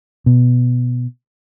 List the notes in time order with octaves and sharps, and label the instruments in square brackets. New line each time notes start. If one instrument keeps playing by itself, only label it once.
[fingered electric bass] B2